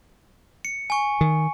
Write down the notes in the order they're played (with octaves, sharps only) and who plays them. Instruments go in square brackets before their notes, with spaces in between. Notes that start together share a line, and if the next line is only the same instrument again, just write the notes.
[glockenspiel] C#7
G#5 C#6
[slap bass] D#3